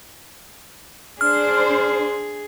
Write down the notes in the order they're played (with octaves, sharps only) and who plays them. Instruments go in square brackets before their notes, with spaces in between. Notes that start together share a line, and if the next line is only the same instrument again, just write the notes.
[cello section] D4 C5 [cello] G#4 [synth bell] F6